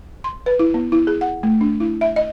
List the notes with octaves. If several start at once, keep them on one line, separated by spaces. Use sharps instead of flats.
C6
B4
E4
B3
E4
G#4
F#5
A3
D4
E4
E5
D#5